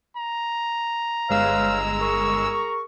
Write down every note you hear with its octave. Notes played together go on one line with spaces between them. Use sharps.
A#5
G1 G#3 B4 C#5 F5 E6
G#4 A#4 C#6